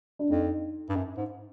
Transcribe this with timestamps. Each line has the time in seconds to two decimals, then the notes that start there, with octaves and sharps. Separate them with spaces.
0.19 D4
0.30 F2 D#4
0.89 G2
0.96 F#2
1.17 G#2